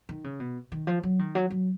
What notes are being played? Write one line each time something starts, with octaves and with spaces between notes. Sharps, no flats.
D#3
C#3
B2
D#3
F3
F#3
D#3
F#3
F#3